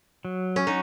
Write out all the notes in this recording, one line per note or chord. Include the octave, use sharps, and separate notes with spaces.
F#3
C#4
D#4 F#4